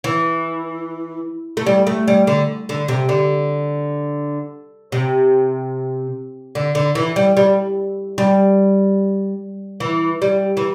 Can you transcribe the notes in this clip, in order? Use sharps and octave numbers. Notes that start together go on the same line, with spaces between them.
E3
A3
G3
A3
G3
D3
D3
C3
D3
C3
D3
D3
E3
G3
G3
G3
E3
G3
E3